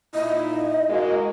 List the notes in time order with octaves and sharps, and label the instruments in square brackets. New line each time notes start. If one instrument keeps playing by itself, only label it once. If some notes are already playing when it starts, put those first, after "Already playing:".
[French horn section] A#2 D#4 E4 [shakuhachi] D#5
[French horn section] G#3 A#3 F#4